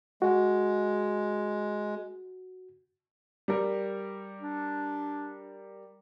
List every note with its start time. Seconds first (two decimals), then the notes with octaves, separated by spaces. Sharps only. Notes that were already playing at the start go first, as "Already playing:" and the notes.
0.22 G#3 F#4
3.48 G3 A#4
4.41 D4